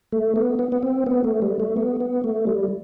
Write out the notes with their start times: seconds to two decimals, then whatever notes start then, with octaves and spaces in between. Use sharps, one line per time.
0.12 A3
0.36 B3
0.59 B3
0.72 B3
0.83 C4
1.07 B3
1.24 A3
1.42 G3
1.60 A3
1.77 B3
2.00 B3
2.24 A3
2.47 G3